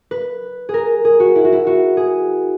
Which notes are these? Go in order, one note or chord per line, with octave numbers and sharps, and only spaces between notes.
B4
G#4 A#4
G#4
F#4
E4
F#4
E4
F#4
G#4